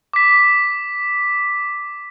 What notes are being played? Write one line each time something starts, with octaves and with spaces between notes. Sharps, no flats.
D6 B6